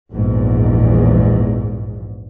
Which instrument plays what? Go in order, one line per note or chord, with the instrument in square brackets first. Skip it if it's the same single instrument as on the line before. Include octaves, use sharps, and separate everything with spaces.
[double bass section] A#1 E2 G#2